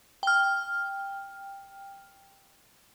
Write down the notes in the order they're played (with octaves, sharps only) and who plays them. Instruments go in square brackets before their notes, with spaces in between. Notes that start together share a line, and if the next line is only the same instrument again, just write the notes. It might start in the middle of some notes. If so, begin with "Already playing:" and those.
[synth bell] G5 F6